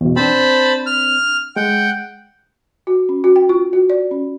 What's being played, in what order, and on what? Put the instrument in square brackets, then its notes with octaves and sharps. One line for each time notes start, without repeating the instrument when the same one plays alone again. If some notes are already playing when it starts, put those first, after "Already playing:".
[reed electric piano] E2 B2
[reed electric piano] C4 D4 [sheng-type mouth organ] C5 A5 B5
[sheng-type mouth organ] F6
[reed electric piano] G#3 [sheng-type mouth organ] F#5 G5
[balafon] F#4
C#4
F#4
G5
F4
F#4
D5
C#4